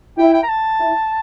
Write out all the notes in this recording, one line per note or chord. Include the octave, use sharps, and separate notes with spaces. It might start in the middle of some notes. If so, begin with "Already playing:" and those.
E4 G5
G5
A#5
A5
E4